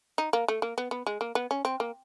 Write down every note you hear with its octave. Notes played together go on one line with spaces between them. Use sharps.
D#4
A#3
A3
A#3
B3
B3
G#3
A#3
B3
C#4
C4
A#3